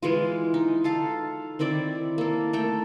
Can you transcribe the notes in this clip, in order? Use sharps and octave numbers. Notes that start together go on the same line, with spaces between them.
E3 G#3 F4
D#4
F4 A4 F5
D#3 C4 E4 D5
A#3 A4
A3 A4 G5